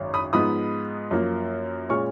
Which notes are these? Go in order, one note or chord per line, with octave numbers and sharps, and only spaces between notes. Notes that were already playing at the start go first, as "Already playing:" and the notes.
Already playing: G#1 F#2
B5 D#6
G#2 F3 B3 D#4 B5 D#6
F#2 F3 A#3
A#2 G#3 C#4 C#6 F6